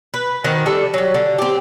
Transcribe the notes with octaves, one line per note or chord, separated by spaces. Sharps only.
B4
D#3 C4 F#4 D#5
G3 D4 A4
F#3 G3
D3
C4 G4